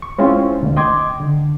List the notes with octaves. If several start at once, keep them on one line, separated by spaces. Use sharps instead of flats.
C#6
G#3 C4 C#4 E4 F4 C5
D2 D3
D#5 G5 C6 D6 G#6
D3